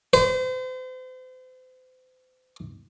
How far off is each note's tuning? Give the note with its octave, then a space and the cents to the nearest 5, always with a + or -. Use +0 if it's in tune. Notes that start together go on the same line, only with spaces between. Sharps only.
C5 -40